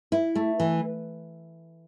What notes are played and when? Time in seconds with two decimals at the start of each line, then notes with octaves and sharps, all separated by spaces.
0.12 E4
0.35 A3
0.60 E3